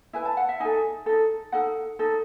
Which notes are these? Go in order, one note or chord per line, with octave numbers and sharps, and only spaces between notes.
E4 B4 G#5
A5
F#5
E5
D#4 A4 G#5
D#4 A4
D#4 A4 F#5
D#4 A4